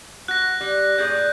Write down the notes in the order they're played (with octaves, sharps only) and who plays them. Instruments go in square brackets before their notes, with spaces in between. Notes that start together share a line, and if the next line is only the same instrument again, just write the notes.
[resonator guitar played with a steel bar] F#4 [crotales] F#6 A#6
[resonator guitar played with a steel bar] G3
[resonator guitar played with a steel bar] A2 G#4 D5 [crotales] G6